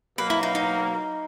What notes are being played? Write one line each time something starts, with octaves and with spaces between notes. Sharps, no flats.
B2 F#3 A#3 B4
E4
D#4
D#4